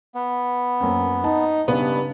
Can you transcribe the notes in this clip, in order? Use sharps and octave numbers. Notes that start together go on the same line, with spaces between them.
B3
F#2 A#3 C4
D#4 A5
G2 C#3 B3